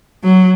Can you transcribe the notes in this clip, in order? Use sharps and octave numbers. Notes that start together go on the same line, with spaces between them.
F#3